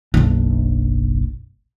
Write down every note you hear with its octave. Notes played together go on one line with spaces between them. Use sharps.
F#1 B1 D4